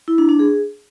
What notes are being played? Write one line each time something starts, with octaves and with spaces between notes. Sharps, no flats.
E4
D4
D4
G#4